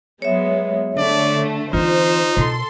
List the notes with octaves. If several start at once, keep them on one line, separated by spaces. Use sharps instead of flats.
F#3 G#3 B3 C#5 E5
D3 A3 D5
E3 C4 D#4 F4 C5
B2 A4 C6